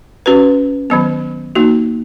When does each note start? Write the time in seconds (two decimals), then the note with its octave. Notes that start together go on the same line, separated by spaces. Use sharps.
0.26 C#4 F#4 B4
0.90 D#3 F#3 B3
1.55 A#3 D#4 F#4